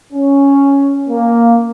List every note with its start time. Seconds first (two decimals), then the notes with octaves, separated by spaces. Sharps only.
0.13 C#4
1.09 A#3